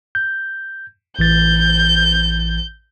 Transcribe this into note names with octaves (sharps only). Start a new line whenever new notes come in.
G6
A1 E3 G6 A6